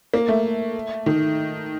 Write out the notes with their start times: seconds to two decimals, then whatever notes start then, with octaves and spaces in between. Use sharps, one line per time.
0.14 A#3
0.28 A3
1.06 D#3